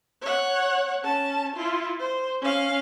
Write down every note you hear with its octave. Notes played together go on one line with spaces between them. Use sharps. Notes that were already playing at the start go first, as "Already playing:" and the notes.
C#5 F#5
C#4 A5
E4 F4
C5
C#4 F5